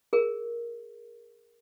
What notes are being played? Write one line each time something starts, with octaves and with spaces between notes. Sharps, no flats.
G#4 A#4